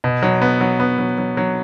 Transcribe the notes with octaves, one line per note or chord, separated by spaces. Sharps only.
B2
F#3
B3
F#3
B3
F#3
F#3
F#3